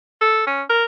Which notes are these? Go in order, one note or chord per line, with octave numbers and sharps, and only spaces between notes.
A4
C#4
A#4